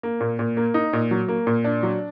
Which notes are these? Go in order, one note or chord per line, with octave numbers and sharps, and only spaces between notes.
A#3
A#2
A#2
A#3
D#4
A#2
F#3
A#3
A#2
D4
F#3